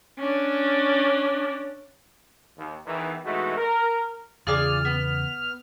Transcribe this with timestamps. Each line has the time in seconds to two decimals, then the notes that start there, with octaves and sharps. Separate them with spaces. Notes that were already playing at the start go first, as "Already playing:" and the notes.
0.19 C#4 D4
2.58 D#2
2.87 E2 D#3 E3
3.25 B2 E3 G#3 A3 D#4 F#4
3.57 A#4
4.47 E2 C#3 F4 G#4 D5 F6
4.85 B3